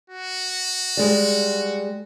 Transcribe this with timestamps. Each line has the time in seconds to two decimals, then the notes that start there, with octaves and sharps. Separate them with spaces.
0.10 F#4
0.97 G3 G#3